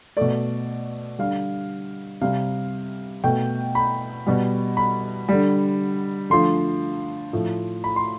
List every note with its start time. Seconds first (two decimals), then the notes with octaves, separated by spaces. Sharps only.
0.17 B2 A3 D5
1.19 D3 G3 F5
2.21 C3 G3 F5
3.24 B2 A3 G5
3.75 B5
4.26 B2 G3
4.77 B5
5.29 D3 G3
6.30 D3 F3 A3 C6
7.33 A2 F3 A3
7.84 B5
7.96 C6